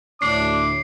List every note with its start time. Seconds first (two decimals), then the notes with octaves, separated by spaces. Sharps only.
0.22 D2 A2 D4 D6 C7